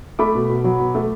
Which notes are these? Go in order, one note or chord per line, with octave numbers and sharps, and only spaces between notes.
A3 B5 D6
B2
B2
F#3
B2
A3